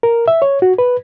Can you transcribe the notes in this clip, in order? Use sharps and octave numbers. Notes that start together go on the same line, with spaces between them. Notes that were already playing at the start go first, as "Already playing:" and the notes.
A#4
E5
C#5
F#4
B4